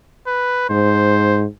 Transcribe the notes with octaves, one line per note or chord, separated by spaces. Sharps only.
B4
G#2 C5